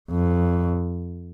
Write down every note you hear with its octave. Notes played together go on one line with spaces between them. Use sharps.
F2